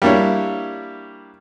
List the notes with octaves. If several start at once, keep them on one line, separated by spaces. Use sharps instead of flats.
G3 A#3 D4 E4 C#5